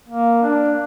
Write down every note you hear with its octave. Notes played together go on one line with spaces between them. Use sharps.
A#3
D4